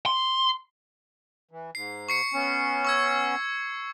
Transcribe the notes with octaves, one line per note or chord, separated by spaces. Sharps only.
C6
E3
G#2 C7
C#6 C7 C#7
B3 C#4
C#6 E6 G#6